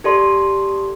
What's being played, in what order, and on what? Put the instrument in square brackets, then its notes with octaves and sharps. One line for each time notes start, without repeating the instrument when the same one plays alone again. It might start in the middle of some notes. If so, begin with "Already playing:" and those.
[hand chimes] G4 A4 D5 C6